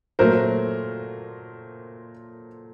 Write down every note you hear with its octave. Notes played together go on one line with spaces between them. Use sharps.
A#2 F#3 A3 A#4 C5